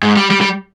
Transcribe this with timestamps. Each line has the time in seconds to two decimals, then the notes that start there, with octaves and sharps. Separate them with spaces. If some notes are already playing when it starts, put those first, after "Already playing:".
0.03 G#2
0.16 G3
0.31 G3
0.41 G3